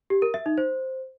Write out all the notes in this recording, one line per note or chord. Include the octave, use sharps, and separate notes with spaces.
G4
A#4
E5
D#4
C5